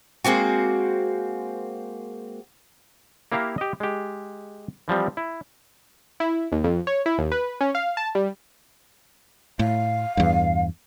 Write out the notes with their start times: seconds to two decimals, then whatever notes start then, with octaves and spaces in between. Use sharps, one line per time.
0.24 G#3 A#3 C4 F#4
3.32 A#3 E4 G4 F5 A#5
3.58 G4 D#5
3.80 G#3 G4
4.88 E3 F3 G3 C4
5.17 E4
6.20 E4
6.52 D#2
6.64 F2
6.87 C#5
7.06 E4
7.18 D#2
7.32 B4
7.61 C#4
7.75 F5
7.97 A5
8.15 G3
9.59 A2 F5
10.17 E2 G2